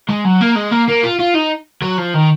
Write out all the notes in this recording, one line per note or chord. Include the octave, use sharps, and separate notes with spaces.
G#3
F#3
A#3
G#3
A#3
A#3
F4
F4
D#4
F#3
F3
D#3